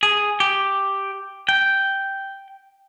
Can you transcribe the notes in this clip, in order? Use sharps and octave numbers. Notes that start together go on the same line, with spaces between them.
G#4
G4
G5